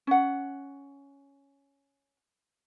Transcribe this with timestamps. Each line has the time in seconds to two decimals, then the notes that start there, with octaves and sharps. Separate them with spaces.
0.07 C#4 F#5